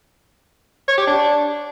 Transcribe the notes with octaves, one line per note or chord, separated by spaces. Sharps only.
C#5
G4
D4